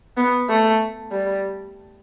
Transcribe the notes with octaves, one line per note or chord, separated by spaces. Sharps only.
B3
A3
G3